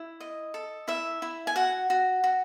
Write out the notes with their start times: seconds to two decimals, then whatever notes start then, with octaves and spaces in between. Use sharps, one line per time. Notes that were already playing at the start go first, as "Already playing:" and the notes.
Already playing: E4
0.20 D#5
0.54 A4
0.88 E4 E5
1.22 E4
1.47 G#5
1.56 F#4 F#5
1.90 F#4
2.24 F#4